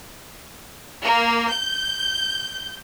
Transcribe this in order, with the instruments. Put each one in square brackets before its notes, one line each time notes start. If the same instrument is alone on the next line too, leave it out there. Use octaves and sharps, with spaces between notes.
[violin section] A#3
G6